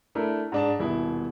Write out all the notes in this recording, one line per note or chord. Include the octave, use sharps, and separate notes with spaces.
A3 D4 E4 A#4
G#2 D4 A5
D#1 B2 E4